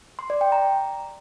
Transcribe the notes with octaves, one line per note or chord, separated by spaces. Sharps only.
C6
D5
G5
A#5